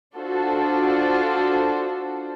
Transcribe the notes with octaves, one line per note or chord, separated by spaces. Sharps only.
D4 F4 F#4 A4 C5